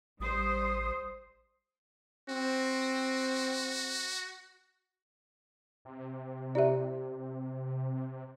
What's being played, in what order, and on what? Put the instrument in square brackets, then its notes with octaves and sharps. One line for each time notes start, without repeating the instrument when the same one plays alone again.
[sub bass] A1 [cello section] G3 C5 [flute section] D#6
[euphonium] C4 [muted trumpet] F#4
[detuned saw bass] C3
[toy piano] E4 G4 C5 [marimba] D5 E5